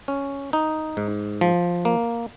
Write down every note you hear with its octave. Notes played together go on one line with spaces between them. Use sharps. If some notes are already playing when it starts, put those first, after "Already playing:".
C#4
D#4
G#2
F3
A#3